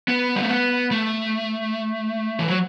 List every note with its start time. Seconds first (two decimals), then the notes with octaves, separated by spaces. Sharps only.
0.08 B3
0.36 G3
0.43 A3
0.49 B3
0.91 A3
2.39 E3
2.48 F#3